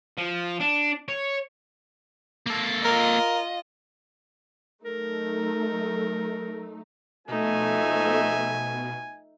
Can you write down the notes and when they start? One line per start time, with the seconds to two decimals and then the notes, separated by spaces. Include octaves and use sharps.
0.18 F3
0.60 D4
1.09 C#5
2.46 A#3 A4
2.85 F4 A#4 D#5
4.85 F#3 A3 D#4 A#4
7.28 B2 F3 A3 D#4 E5 G#5